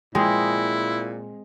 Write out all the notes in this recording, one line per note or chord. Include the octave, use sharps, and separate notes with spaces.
A#2 G#3 C4 E4 G#4